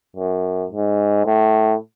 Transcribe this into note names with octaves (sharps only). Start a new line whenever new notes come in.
F#2
G#2
A2